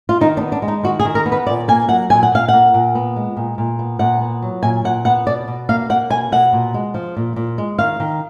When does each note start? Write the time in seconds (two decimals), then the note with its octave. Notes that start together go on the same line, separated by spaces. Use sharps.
0.09 F4
0.21 D#3 D#4
0.37 D4
0.41 B3
0.52 D4
0.62 G#3
0.68 D#4
0.83 D#3 F#4
0.99 G#4
1.05 D#3
1.15 A#4
1.26 B3
1.32 B4
1.47 A#2 D5
1.68 A#3 G#5
1.89 F#3 F#5
2.10 A#2 G#5
2.23 F#5
2.32 A#2 F5
2.48 A#3 F#5
2.74 A#2
2.95 B3
3.16 G#3
3.37 A#2
3.58 A#2
3.79 B3
3.99 A#2 F#5
4.21 B3
4.42 F#3
4.63 A#2 G#5
4.84 A#2 F#5
5.05 B3 F#5
5.27 B2 D5
5.48 B2
5.69 A#3 F5
5.90 A#3 F#5
6.10 B2 G#5
6.32 B2 F#5
6.53 A#2
6.74 G#3
6.94 F3
7.16 A#2
7.36 A#2
7.58 G#3
7.78 D#3 F5
8.00 D#3